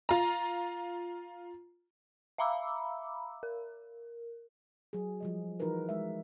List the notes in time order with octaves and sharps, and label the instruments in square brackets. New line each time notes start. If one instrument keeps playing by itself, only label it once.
[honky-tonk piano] F4 A#5
[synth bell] E5 F5 A#5 B5 D6 E6
A#4
[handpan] F#3 G#4
F3 G3 D#5
E3 F3 D#4 F#4 A#4 B4
G#3 E5